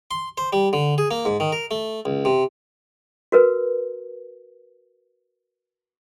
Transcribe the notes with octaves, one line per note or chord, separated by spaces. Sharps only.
C6
C5
G3
D3
G#4
A#3
G#2
D#3
A#4
A3
C#2
C3
F#4 A#4 B4